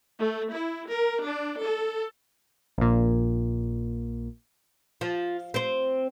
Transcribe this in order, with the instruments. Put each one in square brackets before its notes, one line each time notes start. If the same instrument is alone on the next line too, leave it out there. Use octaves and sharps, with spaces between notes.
[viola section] A3
E4
A#4
D4
A4
[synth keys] A#1 A#2
[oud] F3
C4 C5